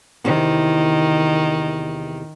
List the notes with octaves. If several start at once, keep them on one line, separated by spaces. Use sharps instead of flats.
E2 C3 D#3